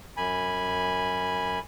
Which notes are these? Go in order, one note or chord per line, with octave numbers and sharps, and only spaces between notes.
F#2 G#5 B5